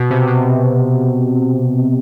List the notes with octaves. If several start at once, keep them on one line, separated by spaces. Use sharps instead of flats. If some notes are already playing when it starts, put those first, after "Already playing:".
Already playing: B2
C3
B2